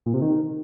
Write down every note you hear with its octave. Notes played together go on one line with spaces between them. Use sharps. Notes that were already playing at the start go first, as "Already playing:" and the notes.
A#2
C3
D#3